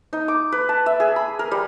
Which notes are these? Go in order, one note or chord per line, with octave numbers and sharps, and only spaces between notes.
D#4
D6
B4
A5
E5
G#4
B5
A#4
G3